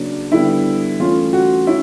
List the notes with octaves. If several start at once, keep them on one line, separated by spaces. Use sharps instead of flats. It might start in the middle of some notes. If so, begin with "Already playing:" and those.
Already playing: C#3 F#3 A#3 D4
D3 G3 B3 E4
E3 A3 C#4 F4
F#4
C#4 E4